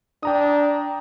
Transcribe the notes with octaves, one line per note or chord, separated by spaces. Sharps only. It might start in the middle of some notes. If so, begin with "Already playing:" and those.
D4 G5 A#5 D#6